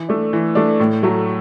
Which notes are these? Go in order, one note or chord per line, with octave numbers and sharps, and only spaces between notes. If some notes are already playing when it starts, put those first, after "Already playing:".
Already playing: E3
A3 D4
E3
A3 D4
A2
F#3 A3